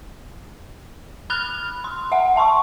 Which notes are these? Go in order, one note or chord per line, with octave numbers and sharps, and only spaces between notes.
B5 F6 F#6 F7
C6
E5 F#5
E5 A5 C6 C#6